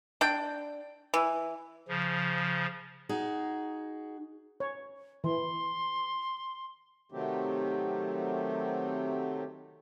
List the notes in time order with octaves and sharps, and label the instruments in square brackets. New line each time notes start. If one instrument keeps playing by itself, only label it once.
[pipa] D4 G5
E3
[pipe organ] C#3 F3
[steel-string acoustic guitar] D#4 F#4 G#4
[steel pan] C#5
[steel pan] E3 [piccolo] C6
[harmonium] C3 D#3 F#3 A3 C4 G4